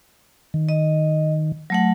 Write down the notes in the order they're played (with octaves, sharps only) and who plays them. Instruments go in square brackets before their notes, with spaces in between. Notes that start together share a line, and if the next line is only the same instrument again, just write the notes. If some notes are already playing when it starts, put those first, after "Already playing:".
[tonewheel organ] D#3
[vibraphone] D#5
F#3 A3 F#5